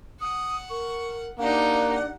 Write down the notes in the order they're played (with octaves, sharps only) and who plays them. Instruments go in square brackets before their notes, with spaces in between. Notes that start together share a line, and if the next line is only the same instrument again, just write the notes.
[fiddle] F#5 [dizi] D#6
[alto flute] A#4 [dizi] C#6
[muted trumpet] A#3 [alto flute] D4 [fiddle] D#4 G4 [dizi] F#5